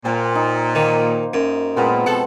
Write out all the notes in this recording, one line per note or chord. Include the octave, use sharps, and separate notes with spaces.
A#2 C5 G5 G#5
D#4
D#3 A#3
F#2
A#2 G#3 B3 C4
F2 B2 A4 F#5